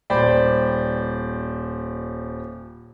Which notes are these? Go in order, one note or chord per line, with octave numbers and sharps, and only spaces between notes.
D#1 C5 D5 G5 B5